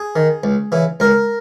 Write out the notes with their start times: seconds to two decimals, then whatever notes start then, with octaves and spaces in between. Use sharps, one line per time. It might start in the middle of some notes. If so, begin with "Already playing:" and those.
Already playing: G#4
0.16 D#3
0.44 C#2
0.72 C#3 E3
1.00 C#2 A#4